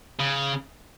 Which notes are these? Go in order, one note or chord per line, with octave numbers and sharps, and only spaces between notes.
C#3